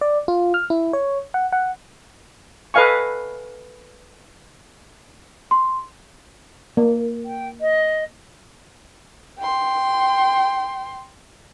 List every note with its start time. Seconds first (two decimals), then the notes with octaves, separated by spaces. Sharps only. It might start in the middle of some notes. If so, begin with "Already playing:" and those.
0.01 D5
0.28 F4
0.54 F6
0.70 E4
0.93 C#5
1.34 F#5
1.52 F#5
2.74 A4 B4 D#5 F5 G#5 C#6
5.51 C6
6.77 A#3
7.24 G5
7.61 D#5
9.39 G5 C6